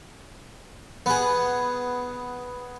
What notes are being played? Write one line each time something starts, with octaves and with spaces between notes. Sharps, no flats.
B3 G#4